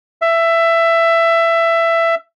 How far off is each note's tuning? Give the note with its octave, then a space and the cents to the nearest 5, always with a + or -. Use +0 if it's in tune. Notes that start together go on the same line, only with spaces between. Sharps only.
E5 +15